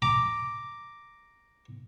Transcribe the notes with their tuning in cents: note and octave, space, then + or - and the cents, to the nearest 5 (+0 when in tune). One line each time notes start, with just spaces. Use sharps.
A#5 +0 D6 +0